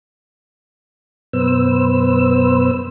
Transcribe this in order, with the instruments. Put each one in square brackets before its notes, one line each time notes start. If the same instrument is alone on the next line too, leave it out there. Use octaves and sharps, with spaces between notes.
[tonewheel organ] F#2 B2 B3 B4 C5 E6